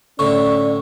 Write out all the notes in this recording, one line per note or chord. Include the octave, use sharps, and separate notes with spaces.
A2 D3 C#4 D5 C#6